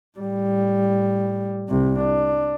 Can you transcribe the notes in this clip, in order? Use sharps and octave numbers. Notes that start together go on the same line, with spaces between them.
A2 G3
C2 C3
D4